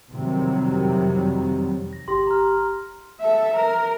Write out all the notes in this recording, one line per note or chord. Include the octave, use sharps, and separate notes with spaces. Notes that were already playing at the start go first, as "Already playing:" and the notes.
F2 C3 D#3 F#3 G3
A#6
G1 G4 C6 A#6
A#5 F6
A4 E5
A#4